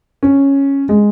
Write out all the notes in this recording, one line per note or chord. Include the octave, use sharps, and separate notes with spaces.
C#4
G#3